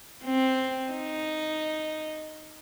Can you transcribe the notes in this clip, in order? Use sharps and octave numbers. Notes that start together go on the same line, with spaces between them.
C4
D#4